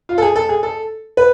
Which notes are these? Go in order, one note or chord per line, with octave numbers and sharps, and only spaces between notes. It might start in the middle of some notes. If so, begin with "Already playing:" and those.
F4
A4
G#4
A4
G#4
A4
B4